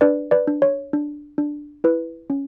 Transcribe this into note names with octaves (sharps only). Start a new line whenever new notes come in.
D4 B4 D5
B4 D5
D4
C#5
D4
D4
E4 B4
C#4